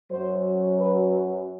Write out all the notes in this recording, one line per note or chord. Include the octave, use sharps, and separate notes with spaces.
F#2 F#3 C5
B4